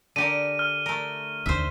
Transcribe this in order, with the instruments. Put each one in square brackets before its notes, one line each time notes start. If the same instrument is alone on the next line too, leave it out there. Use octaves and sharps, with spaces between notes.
[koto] D3 G4 A#4 [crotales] D#7
[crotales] F6
[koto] A3 A#4
[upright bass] D#2 D3 [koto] C5 E5